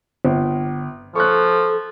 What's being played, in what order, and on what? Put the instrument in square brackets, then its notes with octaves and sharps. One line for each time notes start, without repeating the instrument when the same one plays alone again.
[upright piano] G1
[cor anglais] F3 [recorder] A4 [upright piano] C#6 F#6